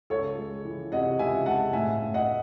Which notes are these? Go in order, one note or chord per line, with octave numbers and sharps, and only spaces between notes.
C#2 A4 C#5
G#3
E3
C3 D#5 F#5
C#2 E5 G#5
G#3 F#5 A5
A2 E5 G#5
A2
D#5 F#5